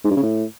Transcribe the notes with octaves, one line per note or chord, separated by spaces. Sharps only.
G#2
G2
C#3
A2